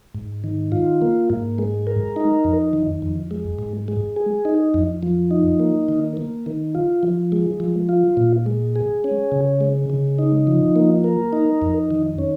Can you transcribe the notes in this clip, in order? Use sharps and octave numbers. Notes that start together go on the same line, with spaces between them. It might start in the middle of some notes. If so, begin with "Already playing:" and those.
G#2
D#3
F4
A#3
G#2
G#3
A#4
D#4
F2
D#3
F2
G#3
G#2
G#3
G#4
D#4
F2
F3
D#4
A#3
D#3
A#3
D#3
F4
F3
G#3
F3
F4
A#2
G#3
G#4
C#4
C#3
G#3
C#3
D#4
F3
A#3
A#4
D#4
F2
D#3
C#4